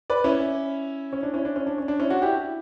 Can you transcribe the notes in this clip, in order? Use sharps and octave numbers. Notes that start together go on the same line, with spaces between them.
B4 D5
C#4 E4
C#4
D4
C#4 E4
D4
C#4
D4
C#4
D4
C#4 E4
D4 F#4
E4 G4